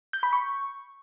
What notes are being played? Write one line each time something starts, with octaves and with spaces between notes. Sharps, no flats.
G6
B5
C#6